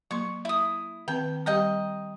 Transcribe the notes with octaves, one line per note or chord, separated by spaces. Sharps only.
F#3 A#3 C6 C#6
E4 D#6
D#3 C4 B4 G5
G3 G4 D#5 G5 A#5